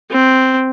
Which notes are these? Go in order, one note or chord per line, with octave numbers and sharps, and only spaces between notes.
C4